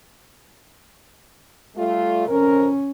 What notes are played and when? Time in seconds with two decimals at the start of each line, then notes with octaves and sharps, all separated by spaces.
1.76 G3 A3 F4
2.28 F2 C#4 A#4